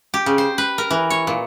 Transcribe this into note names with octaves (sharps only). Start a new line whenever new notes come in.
G4
C#3
C5
B4
A#4
E3
C#5
A#2